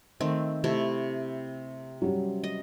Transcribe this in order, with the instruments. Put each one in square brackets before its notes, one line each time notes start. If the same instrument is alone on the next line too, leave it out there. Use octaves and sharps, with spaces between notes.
[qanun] D#3 A3 C4
C3 A3 E4
[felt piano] F#3 G3 C#4
[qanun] D#5